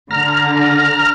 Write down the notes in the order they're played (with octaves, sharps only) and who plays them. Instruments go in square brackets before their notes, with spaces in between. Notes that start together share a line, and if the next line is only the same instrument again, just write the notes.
[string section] D3 [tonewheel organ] A#5 F6